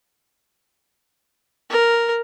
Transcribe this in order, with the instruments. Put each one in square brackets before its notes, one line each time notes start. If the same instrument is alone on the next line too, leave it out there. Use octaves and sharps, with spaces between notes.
[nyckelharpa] A#4